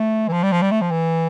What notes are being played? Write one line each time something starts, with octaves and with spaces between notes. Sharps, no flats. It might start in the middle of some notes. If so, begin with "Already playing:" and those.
Already playing: A3
E3
F3
G3
F3
G3
A3
F3
E3